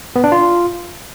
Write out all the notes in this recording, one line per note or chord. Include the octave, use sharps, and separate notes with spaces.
B3
D4
F4